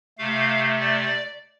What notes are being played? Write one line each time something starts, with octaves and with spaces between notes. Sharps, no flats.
C3 A3 F5
D5